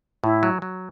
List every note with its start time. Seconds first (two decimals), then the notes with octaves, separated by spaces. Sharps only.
0.24 A2 E4
0.43 F#3
0.62 F#3